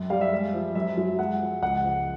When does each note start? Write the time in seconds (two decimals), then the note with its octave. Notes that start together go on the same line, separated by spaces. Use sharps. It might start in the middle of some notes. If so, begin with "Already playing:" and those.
Already playing: F#2
0.10 G3 F5
0.21 E5
0.32 G#3
0.54 F3
0.75 F#2 E5
0.97 F#3
1.19 G#3 F#5
1.41 F3
1.62 C#2 F#5
1.84 F3